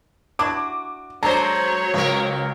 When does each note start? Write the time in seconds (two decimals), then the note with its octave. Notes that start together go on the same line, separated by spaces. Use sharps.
0.39 D4 E4 F#4 D6
1.23 F#3 G#3 D4 C5 C#5 A#5
1.94 C#2 A#3 A#4